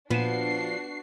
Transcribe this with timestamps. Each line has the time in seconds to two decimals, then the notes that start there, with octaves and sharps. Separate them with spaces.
0.10 A#2 F3 B3 D4 F#4 C7 D#7 E7